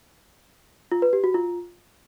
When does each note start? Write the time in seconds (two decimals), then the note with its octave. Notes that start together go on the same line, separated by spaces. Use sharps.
0.92 F4
1.02 B4
1.13 G4
1.24 F#4
1.34 F4